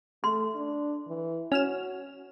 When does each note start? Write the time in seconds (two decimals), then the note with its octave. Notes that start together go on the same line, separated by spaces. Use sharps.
0.24 A3 C6
0.55 D4
1.07 E3
1.52 C#4 F#4 F6 E7